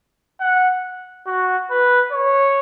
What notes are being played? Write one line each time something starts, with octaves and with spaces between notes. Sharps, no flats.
F#5
F#4
B4
C#5